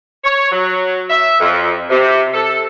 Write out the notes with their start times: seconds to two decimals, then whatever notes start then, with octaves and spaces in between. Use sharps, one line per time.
0.24 C#5
0.52 F#3
1.09 E5
1.40 F2
1.90 C3
2.33 A4